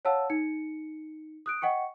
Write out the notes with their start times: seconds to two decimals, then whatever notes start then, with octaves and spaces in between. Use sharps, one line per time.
0.05 C#5 F5 F#5 A5 E6
0.30 D#4 C#7
1.46 D#6 F#6 D7
1.62 D#5 F#5 G5 C#6 C#7